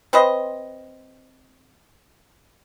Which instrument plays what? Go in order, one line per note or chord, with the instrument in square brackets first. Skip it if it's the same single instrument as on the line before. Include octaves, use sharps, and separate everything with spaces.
[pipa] C4 B4 C5 D#5